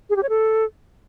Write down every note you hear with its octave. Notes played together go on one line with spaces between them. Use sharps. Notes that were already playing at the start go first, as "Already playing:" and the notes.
G#4
G4
C#5
A4